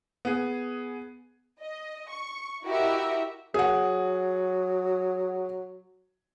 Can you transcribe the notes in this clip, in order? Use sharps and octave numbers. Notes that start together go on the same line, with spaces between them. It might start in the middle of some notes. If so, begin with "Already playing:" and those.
B3 G#4
D#5
C#6
E4 F#4 G4 A#4 D#5 E5
F#3 G#4 F#5